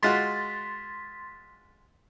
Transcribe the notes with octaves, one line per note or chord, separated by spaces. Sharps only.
G#3 F4 F#4 C6 A6 B6